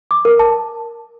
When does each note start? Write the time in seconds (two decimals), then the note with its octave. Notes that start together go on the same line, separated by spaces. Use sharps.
0.11 D6
0.25 A#4
0.39 A5